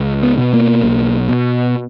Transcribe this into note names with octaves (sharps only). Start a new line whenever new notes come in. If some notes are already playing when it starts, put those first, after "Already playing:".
Already playing: C#2
B3
B2
A#3
B1
B2